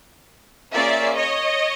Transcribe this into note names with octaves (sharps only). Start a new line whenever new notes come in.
A#3 C#4 F4 G#4 D5 E5
C#5 D#5